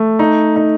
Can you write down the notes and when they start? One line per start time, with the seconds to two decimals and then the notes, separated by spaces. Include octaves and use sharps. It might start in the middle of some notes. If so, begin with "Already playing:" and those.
Already playing: A3
0.19 D#4
0.56 D#4